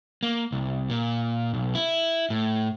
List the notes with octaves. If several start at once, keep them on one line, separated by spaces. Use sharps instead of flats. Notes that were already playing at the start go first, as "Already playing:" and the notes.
A#3
C2
A#2
B1
E4
A2